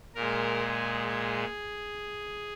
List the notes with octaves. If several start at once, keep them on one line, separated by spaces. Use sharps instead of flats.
A#2 G#3 A#4
G#4
G#4